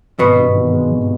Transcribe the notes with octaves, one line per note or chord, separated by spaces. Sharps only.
G#1 B2 B3
G2
D#3
G#3
G#1